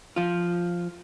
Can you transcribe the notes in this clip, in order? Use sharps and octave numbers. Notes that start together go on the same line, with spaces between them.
F3 F4